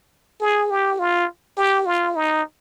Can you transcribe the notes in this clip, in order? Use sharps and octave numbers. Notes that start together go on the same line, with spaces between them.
G#4
G4
F4
G4
F4
D#4